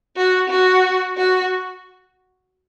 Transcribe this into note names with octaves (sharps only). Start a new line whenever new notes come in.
F#4
F#4
F#4